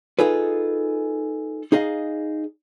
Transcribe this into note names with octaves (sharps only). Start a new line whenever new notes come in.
D#4 F4 G#4 A4 B4
D#4 G#4 D#5 F5